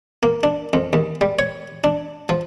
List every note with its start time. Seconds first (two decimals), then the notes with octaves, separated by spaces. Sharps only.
0.23 A#3
0.43 D4
0.73 F2
0.93 D#2
1.21 G3
1.39 C#5
1.84 D4
2.29 F3